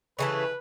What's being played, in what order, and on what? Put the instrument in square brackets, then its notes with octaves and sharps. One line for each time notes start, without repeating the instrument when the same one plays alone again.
[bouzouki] C#3 E3 A3 [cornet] B4